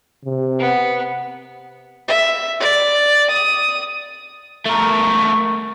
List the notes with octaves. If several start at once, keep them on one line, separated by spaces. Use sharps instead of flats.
C3
B3
E5
D5
D#6
A3 A#4 C#6